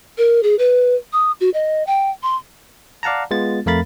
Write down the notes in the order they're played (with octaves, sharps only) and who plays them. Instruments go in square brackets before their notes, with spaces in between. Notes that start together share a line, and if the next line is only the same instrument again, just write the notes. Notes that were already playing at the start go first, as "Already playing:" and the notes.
[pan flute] A#4
G#4
B4
D#6
F#4
D#5
G5
C6
[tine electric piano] D5 F5 F#5 A5 A#5
G#3 B3 F4 A6
F2 A3 A#4 F5 B5 A6